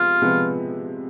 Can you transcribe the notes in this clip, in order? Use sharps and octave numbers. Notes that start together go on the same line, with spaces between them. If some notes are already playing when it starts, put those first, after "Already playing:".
Already playing: C3 F3 G#3 B3 F4
C3 F3 G#3 B3